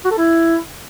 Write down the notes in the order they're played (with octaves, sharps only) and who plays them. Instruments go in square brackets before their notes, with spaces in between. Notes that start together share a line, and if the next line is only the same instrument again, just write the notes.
[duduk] F#4
A4
E4